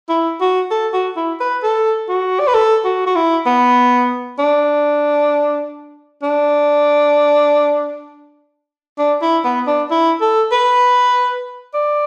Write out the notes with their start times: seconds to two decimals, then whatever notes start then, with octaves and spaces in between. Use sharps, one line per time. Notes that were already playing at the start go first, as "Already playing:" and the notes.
0.09 E4
0.41 F#4
0.71 A4
0.93 F#4
1.16 E4
1.40 B4
1.63 A4
2.09 F#4
2.40 D5
2.47 B4
2.54 A4
2.85 F#4
3.07 F#4
3.16 E4
3.46 B3
4.39 D4
6.23 D4
8.98 D4
9.22 E4
9.44 B3
9.67 D4
9.91 E4
10.21 A4
10.52 B4
11.74 D5